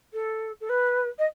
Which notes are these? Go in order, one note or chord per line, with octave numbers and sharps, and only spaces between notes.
A4
A4
B4
D#5